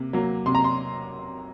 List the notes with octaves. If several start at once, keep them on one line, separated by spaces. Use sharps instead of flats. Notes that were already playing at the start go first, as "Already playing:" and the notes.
Already playing: C3 A#3
F#3 A#3
C3 C6
A#5
C6